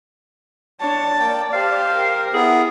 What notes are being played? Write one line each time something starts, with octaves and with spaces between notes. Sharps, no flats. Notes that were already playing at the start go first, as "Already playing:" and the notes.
D4 C#5 A5
A#3 D5 G5
G4 C5 F5
A#4
B3 E4 G#4